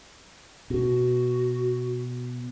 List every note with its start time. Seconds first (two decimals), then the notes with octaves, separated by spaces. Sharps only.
0.70 B2 F#4